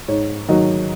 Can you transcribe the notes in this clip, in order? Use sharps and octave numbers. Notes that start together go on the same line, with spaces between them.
G#2 C#5
D#3 F#3 D#5